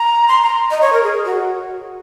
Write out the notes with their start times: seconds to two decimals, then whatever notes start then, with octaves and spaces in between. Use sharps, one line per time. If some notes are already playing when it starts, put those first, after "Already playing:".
Already playing: A#5
0.28 C6
0.42 A#5
0.71 D#5
0.81 C#5
0.93 A#4
1.03 G#4
1.25 F#4